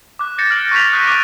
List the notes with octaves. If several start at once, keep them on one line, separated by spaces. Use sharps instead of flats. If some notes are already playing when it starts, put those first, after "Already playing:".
D6 F#6
G6 A6 A#6 C#7 E7
F6 C7 D7 F#7
C#6 G6 B6 F7
D#6 F#6 G6 A#6 C7 D#7
D6 F#6 C7 D7